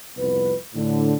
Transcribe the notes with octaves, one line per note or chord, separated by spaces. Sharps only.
C2 F2 B3 B4
A2 D3